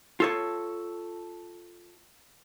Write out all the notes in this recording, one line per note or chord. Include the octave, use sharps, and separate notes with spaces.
F4 A4 C#5